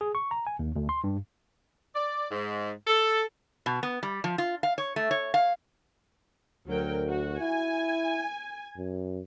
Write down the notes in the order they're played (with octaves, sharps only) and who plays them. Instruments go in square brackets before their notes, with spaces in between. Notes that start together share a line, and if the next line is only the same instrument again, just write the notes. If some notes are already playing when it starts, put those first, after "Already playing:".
[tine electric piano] G#4
C#6
A#5
G#5
D#2
D2
C6
G2
[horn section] D5
G#2
A4
[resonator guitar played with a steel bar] B2
B3
G3
F3
F4
F5
C#5
A3
C#5
F5
[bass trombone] D2 [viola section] F#3 A#4 G5
[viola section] F#4
[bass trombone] E4 [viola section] G#5
[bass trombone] F#2